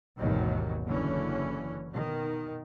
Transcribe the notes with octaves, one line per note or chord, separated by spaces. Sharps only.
G#1 D#2 B2 D#3 E3 F#3
F#1 D3 E3 C#4
B2 D#3